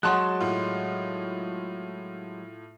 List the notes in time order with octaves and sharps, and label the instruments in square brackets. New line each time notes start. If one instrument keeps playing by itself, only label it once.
[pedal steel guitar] F#3 G#3 [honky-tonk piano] F#4 A5 [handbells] F#5 C6 F#6
[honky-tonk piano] A2 F4